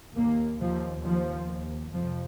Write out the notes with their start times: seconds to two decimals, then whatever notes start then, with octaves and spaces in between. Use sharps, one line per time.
0.16 D#2 A#3
0.60 D#2 F3
1.04 D#2 F3
1.49 D#2
1.93 F2 C3 F3